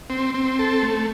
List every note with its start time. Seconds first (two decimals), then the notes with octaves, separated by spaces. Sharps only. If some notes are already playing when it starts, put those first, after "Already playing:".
0.10 C4
0.34 C4
0.59 A4
0.83 A3